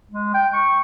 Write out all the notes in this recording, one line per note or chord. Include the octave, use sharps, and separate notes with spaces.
G#3
G5
C#6